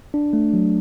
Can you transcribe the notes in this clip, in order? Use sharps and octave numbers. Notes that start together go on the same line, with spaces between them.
D4
A3
F#3